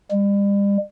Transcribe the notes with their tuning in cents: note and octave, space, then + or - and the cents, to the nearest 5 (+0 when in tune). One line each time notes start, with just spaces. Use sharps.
G3 +40